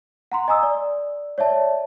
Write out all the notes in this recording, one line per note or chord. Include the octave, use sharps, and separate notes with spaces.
F#5 A#5 C6
D#5 G#5 A#5 D#6 E6
D5
C#5 D5 E5 A5